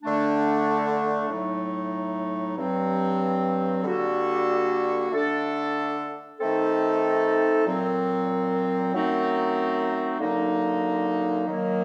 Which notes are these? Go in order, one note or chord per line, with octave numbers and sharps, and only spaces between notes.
D3 A3 D4
A2 F#3 A3 D#4
G2 F#3 C4
D3 G3 A#3 F#4 A4
D3 A3 D4 A4
D#3 A3 C4 D#4 A4
A#2 F#3 C4
F#2 F#3 A3 C4 D#4
F#2 D3 F#3 A#3 D#4
D#3 F#3 A#3